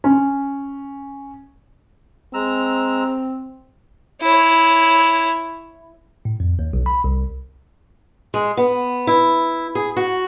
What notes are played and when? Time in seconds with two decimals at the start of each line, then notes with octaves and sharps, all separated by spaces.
0.04 C#4
2.34 G#3 C4 A#5 E6
4.21 E4 C#5
6.25 A2
6.40 F2
6.59 D#2
6.73 B1
6.86 B5
7.04 C2
8.34 G#3
8.57 B3
9.07 E4
9.75 G#4
9.97 F#4